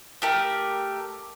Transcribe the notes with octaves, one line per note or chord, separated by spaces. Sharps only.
A3 G4 A#4